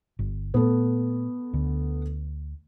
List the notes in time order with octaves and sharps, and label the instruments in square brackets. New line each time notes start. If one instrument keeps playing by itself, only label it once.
[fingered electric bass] G1
[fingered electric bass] A#2 A3 [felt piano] B3 A4
[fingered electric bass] D2 D3